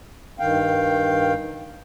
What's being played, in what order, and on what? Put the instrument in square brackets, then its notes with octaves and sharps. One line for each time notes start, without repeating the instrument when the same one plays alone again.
[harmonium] G2 D#3 F5 G5